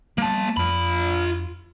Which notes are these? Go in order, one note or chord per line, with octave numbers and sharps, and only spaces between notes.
G3 A#3 B3 A5
F2 F4 B5